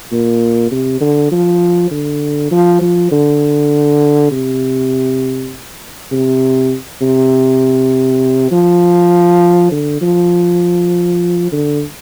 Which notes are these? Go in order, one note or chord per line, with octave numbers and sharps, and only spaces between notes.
A#2
C3
D3
F3
D3
F3
F3
D3
C3
C3
C3
F3
D3
F3
D3